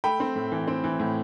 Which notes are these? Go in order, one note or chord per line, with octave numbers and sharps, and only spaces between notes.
A3 G5 B5
C4
A2
E3
C4
E3
A2